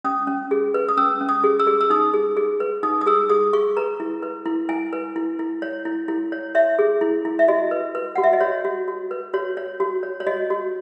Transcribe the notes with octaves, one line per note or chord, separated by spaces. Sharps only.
C#4 D#6
C#4
G#4
B4
D#6
C#4 E6
C#4
D#6
G#4
E6
G#4
E6
D#4 D#6
G#4
G#4
B4
D#4 D#6
D#6
G#4 E6
G#4 D#6
G#4 C#6
B4 A#5
E4
B4
E4
E4 G#5
B4
E4
E4
C#5
E4
E4
C#5
C#5 E5
G#4
E4
E4
E5
F#4 D#5
B4
B4
F#4 F#5
E5
D#5
F#4 C#5
F#4
F#4
B4
F#4 C#5
C#5
F#4
C#5
C#5
F#4 D#5
F#4